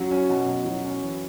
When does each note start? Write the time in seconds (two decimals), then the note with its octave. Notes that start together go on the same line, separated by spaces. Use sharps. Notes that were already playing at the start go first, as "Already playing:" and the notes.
Already playing: F#2 F#3
0.11 C#4
0.29 B2
0.47 B2
0.65 F#3
0.85 C#4
1.02 E3